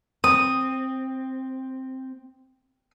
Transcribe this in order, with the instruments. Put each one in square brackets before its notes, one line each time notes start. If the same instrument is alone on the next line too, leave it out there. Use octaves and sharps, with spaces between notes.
[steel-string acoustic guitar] C4 [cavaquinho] D#6